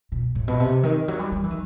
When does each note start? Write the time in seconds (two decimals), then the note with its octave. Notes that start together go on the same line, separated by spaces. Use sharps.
0.12 B2
0.35 A2
0.48 B2
0.60 C3
0.83 D#3
1.08 F#3
1.19 G3
1.32 G3
1.44 E3
1.51 D#3